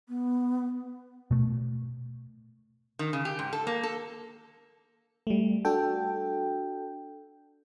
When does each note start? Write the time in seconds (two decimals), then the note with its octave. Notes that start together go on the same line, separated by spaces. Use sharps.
0.09 B3
1.31 B2 A3
2.99 D#3
3.13 C#3
3.25 G4
3.39 G#2
3.53 A4
3.67 A#3
3.83 A4
5.27 G3 A3
5.65 D4 F#4 A4 G5